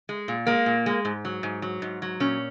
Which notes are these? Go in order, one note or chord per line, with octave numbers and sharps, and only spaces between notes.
G#3
A#2
G#3 A#3
A#2
G#3
G#2
F#3
G#2
F#3
G#2
F#3
A#2 C#4